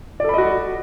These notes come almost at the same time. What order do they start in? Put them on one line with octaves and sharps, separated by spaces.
D5 A4 B5 D#5 F#4